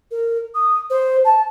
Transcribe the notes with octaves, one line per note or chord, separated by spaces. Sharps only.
A#4
D#6
C5
A5